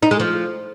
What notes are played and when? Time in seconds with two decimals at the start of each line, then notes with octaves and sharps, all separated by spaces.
0.03 D#4
0.11 G#3
0.20 F3